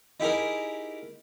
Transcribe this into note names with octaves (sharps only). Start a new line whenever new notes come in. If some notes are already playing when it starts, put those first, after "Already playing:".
D#4 E4 G4 G#4 A#4